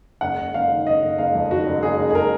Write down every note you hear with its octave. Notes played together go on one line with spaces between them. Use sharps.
F#1 F#5
F#1
F#1 F5
D#3
F#1 D#5
F#1
F#1 F5
F2
D#3 F#4
F#1
F#1 G#4
F#1
G#4
A#4